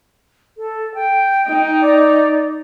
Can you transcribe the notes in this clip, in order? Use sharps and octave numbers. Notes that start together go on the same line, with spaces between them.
A4
G5
D#4
D5